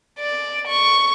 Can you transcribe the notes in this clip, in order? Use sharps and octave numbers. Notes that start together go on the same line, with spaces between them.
D5
C#6